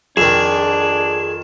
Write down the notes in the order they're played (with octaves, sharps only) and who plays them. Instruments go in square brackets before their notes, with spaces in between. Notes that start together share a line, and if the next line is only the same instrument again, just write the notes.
[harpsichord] F2 D#3 [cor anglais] D4 [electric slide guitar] G#4 [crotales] E7